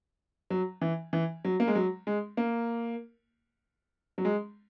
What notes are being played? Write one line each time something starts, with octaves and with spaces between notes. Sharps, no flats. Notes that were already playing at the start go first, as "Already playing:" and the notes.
F#3
E3
E3
F#3
A#3
G#3
F#3
G#3
A#3
F#3
G#3